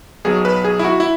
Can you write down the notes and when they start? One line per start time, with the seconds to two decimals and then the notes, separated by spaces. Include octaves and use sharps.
0.25 B1 B2 F#3 G#4
0.45 B4
0.64 G#4
0.79 E4
0.85 F#4
1.00 E4